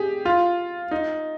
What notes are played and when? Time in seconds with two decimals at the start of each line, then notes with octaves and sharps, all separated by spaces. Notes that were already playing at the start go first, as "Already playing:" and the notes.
Already playing: G4 G#4
0.25 F4
0.91 D#4